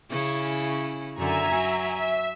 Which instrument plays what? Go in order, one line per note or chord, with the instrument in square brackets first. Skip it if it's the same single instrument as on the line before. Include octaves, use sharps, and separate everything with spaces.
[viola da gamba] C#3 C#4 E4
[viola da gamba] F#2 D3 [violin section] E5 G#5 A#5
[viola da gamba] F#3
[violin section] E5